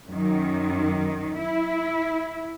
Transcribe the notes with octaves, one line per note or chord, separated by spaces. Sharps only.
F#2 D#3
E4